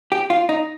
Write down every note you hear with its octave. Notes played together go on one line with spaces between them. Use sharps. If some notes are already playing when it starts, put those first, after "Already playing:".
G4
F4
D#4